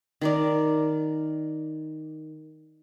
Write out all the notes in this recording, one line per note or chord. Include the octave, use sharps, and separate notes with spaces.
D#3 A#4 D5